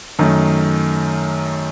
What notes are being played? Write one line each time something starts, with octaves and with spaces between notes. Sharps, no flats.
F#2 D#3 A3